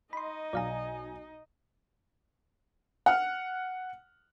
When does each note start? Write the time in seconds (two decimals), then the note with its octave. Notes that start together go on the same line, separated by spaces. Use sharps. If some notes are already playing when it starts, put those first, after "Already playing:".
0.13 D#4 D#5 B5 C6
0.53 B1 D5 F5 G#5 A#5
3.06 F#5 F6